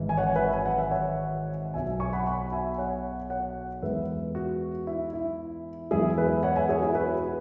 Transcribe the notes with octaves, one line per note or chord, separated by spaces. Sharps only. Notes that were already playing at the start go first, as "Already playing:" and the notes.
Already playing: G#1 G#2 E3
G#5
C#5 F#5
B4 E5
G#5
F#5
E5
C#5 F#5
B1 B2 F#3 E5 G#5
G#5 C#6
F#5 B5
F#5 B5
E5 G#5
C#5 F#5
C#5 F#5
E2 E3 G#3 B4 E5
F#4
E4
E4
E2 E3 G#3 E4 G#4
B4 E5
C#5 F#5
E5 G#5
G#4 C#5
E4 G#4
F#4 B4
F#4